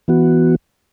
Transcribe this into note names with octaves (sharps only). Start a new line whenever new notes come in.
E3 B3 F#4